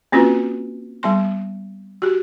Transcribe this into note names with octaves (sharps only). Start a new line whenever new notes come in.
A#3 C4 C#4 F4 F#4 B4
G3 B3 C6
F#4 G4